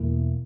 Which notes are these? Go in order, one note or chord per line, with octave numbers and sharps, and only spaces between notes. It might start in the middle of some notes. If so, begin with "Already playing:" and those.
Already playing: E2 B2 A#3 E4